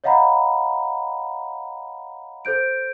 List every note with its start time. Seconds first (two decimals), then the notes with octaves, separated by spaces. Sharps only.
0.04 C#5 D#5 F5 F#5 A#5 B5
2.45 A4 C5 G6 D7